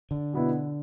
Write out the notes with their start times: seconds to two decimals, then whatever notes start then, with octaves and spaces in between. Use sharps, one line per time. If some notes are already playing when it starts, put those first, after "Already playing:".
0.11 D3
0.33 B2 B3 E4